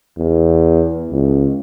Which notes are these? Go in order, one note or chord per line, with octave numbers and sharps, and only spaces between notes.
E2
C#2